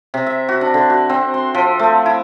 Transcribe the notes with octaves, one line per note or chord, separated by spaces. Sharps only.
C3
E5
F#4
D4
D3
F#4
C4
C6
F3
A3
E4